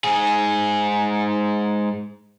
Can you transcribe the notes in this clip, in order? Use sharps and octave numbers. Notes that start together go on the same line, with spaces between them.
G#2 G#4